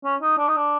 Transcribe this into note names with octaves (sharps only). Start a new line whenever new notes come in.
C#4
D#4
D4
D#4
D4